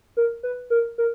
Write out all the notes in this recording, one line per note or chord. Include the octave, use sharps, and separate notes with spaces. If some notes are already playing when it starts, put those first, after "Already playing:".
A#4
B4
A#4
A#4